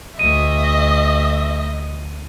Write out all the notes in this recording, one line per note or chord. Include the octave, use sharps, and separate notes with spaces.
D2 D#5 E5 D#7